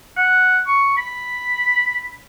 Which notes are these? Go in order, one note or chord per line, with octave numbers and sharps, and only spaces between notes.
F#5
C#6
B5